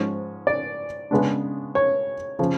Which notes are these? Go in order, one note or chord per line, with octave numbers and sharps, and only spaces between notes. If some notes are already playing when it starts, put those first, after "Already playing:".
Already playing: G#2 F3 G#3 C#4
D5
C#3 G#3 B3 D4
C#5
C#3 F3